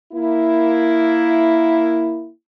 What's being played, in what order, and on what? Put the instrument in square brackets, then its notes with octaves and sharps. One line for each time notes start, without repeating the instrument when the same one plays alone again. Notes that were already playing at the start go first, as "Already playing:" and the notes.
[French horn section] A#3 E4